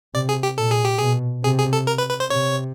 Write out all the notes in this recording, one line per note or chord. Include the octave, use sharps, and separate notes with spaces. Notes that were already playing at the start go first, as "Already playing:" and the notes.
C3 D5
G#4
G4
A#2 A4
G#4
G4
B2 G#4
C3 G#4
G#4
A4
A#4
B4
B4
C5
C3 C#5